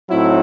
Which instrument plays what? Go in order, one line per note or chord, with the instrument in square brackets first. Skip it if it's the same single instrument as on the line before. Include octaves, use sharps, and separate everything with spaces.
[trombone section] A2 F#3 C4 D#4 [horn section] E4